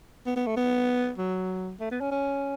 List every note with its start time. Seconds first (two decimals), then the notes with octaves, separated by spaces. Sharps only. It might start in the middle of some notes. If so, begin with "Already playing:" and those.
0.26 B3
0.36 B3
0.47 A3
0.56 B3
1.18 F#3
1.80 A3
1.91 B3
2.01 C#4
2.11 C#4